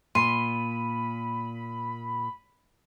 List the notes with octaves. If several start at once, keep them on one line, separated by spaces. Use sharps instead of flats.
A#2 B5 C6 D#7